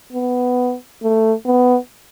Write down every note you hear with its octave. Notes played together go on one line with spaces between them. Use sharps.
B3
A3
B3